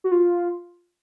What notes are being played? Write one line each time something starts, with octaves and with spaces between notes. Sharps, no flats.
F#4
F4